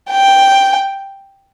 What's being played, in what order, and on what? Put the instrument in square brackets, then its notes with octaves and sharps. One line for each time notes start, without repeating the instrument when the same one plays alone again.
[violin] G5